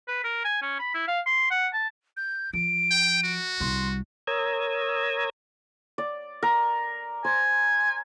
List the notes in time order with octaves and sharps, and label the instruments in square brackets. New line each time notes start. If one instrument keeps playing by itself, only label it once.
[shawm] B4
A#4
G#5
C#4
B5
E4
F5
C6
F#5
A5
[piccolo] G6
[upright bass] F3 [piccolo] D7
[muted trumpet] G5
F#4
[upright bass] C2 G3 [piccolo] C6
[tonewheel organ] A#4 C#5 A#5 D#6 E6 G#6
[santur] D5
A#4
[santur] C5 [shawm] G#5